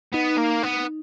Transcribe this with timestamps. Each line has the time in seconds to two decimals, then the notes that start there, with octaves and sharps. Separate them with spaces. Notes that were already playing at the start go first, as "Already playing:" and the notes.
0.14 B3 D#4
0.38 A#3
0.63 B3